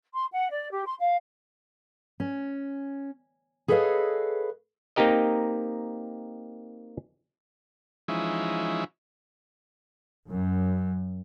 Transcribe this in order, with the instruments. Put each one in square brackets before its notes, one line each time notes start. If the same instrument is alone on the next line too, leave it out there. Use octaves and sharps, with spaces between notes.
[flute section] C6
F#5
D5
G4
C6
F5
[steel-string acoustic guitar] C#4
G#4 A4 B4 C#5 D#5 F5
[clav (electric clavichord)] A#3 C4 D#4 G4 A#4 D#5
[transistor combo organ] E3 F3 G#3 C#4 D#4 E4
[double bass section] F#2